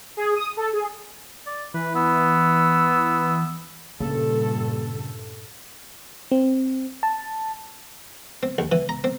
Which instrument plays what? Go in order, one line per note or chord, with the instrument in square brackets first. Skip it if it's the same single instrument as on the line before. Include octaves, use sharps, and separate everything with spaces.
[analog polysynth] G#4
D#6
A4
G#4
[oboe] D5
[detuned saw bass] E3 [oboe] B4
[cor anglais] B3 [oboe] E6
[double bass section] G2 A#2 [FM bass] C#3 [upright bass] A#3 [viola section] A4
[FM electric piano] C4
A5
[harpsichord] C4
D#2
E3
A#5
C4